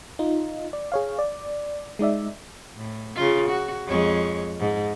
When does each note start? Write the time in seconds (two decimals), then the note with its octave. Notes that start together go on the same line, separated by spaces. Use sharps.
0.19 D#4 F4
0.73 D5
0.92 G#4 C#5 F5
1.19 D5
1.99 G#3 D#4 D5 E5
2.77 A2
3.15 C#3 F4
3.49 F#4
3.87 F2 G#3 C#5
4.59 G#2